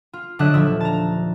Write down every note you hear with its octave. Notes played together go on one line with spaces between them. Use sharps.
F4
D3 F#3 D4 D#5 E5 F#6
D#1 F3 E5 E6
A5 A#5